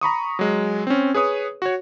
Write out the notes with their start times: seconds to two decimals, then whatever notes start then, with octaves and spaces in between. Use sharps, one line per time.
0.01 A#5 B5 C#6 D#6
0.39 F#3 G#3
0.87 C4 C#4
1.14 G#4 B4 C#5 D#6
1.62 F#4 C#5